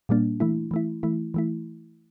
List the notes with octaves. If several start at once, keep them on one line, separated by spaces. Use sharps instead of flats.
A#2 G3 A#3 D4
E3 A3 E4
E3 A3 E4
E3 A3 E4
E3 A3 E4